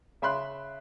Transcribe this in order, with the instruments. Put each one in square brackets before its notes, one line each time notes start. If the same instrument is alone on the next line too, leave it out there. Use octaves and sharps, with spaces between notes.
[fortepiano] C#3 E5 B5 C6 F#6